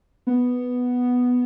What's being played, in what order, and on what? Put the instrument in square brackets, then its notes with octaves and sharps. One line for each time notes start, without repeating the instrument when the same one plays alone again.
[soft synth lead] B3